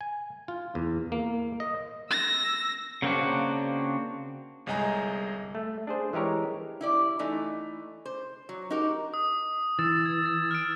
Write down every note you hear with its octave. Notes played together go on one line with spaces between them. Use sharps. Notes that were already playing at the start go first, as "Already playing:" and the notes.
G#5
F4
E2
A#3
D#5
E6 A#6
C#3 A#3 C4 D4 F#4
G1 C2 G#3 D#5 G#5 A#5
A3
D4 G#4 C5
E3 G#3 G4 A#4 C#5
E4 G4 D5
E3 A3 D#4
C5
F#3
D#4 F#4 G4 A#4
D#6
E3 E6 A6 E7
G#6
A6
F6 D7